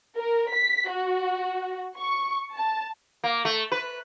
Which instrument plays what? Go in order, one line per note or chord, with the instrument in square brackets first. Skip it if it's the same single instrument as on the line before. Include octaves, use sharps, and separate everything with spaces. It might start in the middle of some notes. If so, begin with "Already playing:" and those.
[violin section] A#4
B6
F#4
C#6
A5
[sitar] A#3
A3
B4